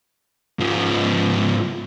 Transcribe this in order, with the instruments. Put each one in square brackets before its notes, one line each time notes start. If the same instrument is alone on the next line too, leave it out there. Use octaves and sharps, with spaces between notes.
[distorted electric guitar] G#2 F3